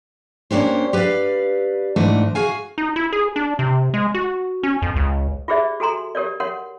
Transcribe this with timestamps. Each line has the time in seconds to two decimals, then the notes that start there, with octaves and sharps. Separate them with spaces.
0.51 A#3 C#4 D4 G4 C5
0.93 G4 B4 C#5 D5 F5
1.96 G#2 E3 A3 D4 D#5
2.35 F#4 G#4 F5 G#5
2.78 D#4
2.96 E4
3.13 G#4
3.36 D4
3.59 C3
3.94 G#3
4.14 F#4
4.63 C#4
4.82 F2
4.96 C#2
5.48 F4 G4 G#4 C5 D5 E5
5.80 F#4 A4 G#5 A#5 C6
6.15 G4 A#4 C#5 D5
6.40 A#4 C#5 F#5 C6